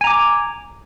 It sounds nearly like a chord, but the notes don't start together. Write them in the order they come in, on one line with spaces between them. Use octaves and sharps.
G#5 A#5 D6